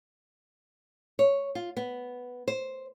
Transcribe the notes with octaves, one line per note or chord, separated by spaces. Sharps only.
C#5
F4
B3
C5